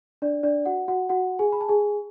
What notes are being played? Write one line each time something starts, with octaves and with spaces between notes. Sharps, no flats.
D4 D5
D4 D5
F#4 F#5
F#4 F#5
F#4 F#5
G#4 G#5
B5
A5
G#4 G#5